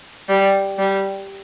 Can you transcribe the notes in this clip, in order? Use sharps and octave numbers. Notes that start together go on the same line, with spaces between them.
G3
G3